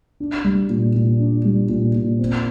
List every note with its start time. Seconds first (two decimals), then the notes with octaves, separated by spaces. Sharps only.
0.20 D4
0.44 G3
0.69 A#2
0.95 A#2
1.20 D4
1.45 G3
1.69 A#2
1.94 A#2
2.19 C4